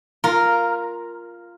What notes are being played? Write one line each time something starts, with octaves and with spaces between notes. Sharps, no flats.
F4 A#4